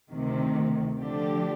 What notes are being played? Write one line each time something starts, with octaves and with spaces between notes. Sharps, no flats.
D2 C3 D#3
D3 F3 A3 D4 G4